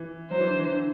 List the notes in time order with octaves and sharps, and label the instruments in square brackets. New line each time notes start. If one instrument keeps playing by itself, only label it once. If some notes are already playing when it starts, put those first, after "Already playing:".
Already playing: [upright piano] E3
[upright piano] F#3 [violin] C5
[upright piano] E3
D3
E3
D3